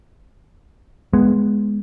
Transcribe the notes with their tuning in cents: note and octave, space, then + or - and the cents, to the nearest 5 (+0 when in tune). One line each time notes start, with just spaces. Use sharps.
G#3 +0 B3 +0